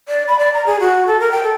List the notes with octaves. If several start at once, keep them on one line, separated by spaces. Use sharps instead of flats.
D5
B5
D5
A#5
G#4
F#4
A4
A#4
G5
A4